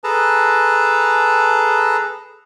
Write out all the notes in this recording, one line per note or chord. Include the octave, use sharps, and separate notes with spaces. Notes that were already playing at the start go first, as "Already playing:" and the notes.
G#4 A4 B4 A5 A#5